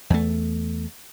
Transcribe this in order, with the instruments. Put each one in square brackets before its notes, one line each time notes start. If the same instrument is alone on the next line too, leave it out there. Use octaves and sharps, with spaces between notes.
[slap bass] E2 A3